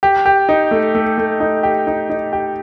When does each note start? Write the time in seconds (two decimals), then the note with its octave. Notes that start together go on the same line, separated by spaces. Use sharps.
0.03 G4
0.26 G4
0.49 D#4
0.71 A3
0.95 A3
1.18 A3
1.40 D#4
1.63 G4
1.87 D#4
2.10 D#4
2.33 G4